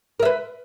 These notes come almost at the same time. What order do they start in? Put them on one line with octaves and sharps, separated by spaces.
A#4 E5 B4